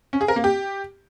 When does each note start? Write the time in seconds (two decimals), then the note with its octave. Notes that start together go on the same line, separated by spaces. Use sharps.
0.13 C#4
0.21 G#4
0.28 A#4
0.36 A#3
0.44 G4